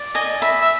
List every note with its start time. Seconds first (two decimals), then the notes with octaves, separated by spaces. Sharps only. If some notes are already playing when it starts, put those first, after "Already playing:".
Already playing: D5
0.15 D#5 G#5
0.42 E5 B5
0.62 E5